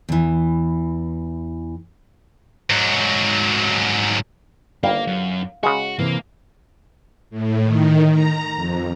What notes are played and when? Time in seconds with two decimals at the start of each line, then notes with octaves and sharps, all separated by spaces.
0.09 E2 E3
2.70 G#2 F#3
4.83 G1 D#3 G3 A#3 F5
5.07 F#2
5.63 C#3 G#3 F#4
5.99 C3 E3 A#3
7.30 A2
7.63 D#3
8.12 A#5
8.56 F2